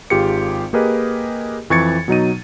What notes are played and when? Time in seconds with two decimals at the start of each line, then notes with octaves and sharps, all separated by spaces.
0.10 G#1 F4 G4 G#4 C#7
0.73 A#3 G4 G#4 A#4 B4 D#5
1.70 F2 E3 C#6 G#6 A6 C#7
2.08 B2 F#3 D#4 D#7